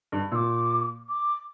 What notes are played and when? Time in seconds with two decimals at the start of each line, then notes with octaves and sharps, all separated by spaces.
0.12 G2
0.31 A#2 D6 E6
1.08 D6